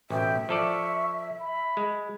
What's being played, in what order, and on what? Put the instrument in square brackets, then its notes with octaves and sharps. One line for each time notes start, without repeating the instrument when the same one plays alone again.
[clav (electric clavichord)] A1 B2 [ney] E5 [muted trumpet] G5
[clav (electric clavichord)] F3 A4 D5 [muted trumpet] C#6
[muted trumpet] B5
[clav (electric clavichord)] G#3